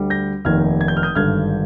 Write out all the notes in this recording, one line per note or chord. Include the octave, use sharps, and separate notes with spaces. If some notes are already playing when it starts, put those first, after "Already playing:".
Already playing: D2 D3 G3
G6 A#6
F1 D#2 D#3 F6 G#6
G#6
G6
F6
D#6 G6
G#1 G2 D3 F6 G#6